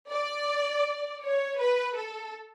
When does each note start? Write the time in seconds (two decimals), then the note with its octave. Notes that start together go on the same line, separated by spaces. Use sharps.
0.11 D5
1.23 C#5
1.60 B4
1.97 A4